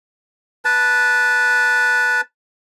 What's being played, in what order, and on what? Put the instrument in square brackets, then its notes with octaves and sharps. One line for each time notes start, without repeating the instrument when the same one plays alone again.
[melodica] B4 A5